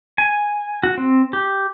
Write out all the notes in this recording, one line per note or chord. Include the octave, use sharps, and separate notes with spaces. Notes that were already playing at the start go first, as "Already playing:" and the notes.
G#5
F#4
C4
G4